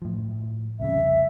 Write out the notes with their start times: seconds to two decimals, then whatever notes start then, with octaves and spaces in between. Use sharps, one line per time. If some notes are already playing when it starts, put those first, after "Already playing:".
0.02 A2 F3
0.80 C2 F2 C#3 E5